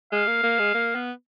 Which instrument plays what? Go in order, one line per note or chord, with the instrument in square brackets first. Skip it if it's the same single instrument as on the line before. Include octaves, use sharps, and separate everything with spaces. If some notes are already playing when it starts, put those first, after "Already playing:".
[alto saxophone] G#3 [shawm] F5
[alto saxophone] A#3
A#3
G#3
A#3
B3